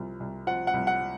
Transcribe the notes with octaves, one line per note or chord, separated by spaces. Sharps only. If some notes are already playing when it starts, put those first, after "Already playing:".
Already playing: C2 F3
C2
F3 F#5
F#5
C2
F#5